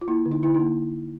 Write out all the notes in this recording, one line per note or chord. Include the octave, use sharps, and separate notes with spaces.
F4
A#3 E4
D3
D#4
D3 E4
A#3 D#4